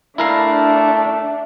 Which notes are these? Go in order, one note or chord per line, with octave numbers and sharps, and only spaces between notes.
A3 D4 E4 A#4 E5 F5